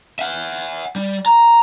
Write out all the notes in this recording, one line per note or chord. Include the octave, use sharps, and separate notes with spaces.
E5 F#5
G3
A#5